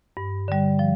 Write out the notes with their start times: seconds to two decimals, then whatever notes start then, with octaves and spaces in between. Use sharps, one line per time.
0.17 G2
0.48 D3 G3
0.79 F3